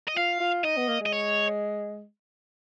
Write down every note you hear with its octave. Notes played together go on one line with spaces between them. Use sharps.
D#5
F4 F5
F4
D#4 D#5
B3
A#3
G#3
D#5
C#5